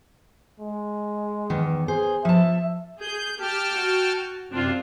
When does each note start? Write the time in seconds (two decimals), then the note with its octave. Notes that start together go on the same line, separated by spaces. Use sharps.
0.60 G#3
1.50 E2 D#3
1.88 G#4 C5
2.25 F3 E5 A5
3.00 G#4 G6
3.39 G4 G5 A5 F6
3.73 F#4
4.51 F#2 C3 C4 D4 F4